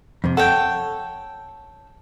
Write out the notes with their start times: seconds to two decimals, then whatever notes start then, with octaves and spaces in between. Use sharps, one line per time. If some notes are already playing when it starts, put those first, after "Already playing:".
0.24 F2 C3
0.37 A4 C#5 F#5 G5